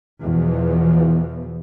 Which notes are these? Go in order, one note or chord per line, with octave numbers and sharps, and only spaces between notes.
E2 B2 E3 F3